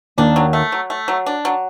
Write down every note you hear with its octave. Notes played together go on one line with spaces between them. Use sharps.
D#2 D#3 D4
F#3
A3
F#3
A3
F#3
D4
F#3